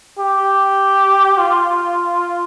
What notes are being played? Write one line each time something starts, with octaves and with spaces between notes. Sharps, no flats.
G4
F4